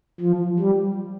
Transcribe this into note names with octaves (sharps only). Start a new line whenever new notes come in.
F3
G3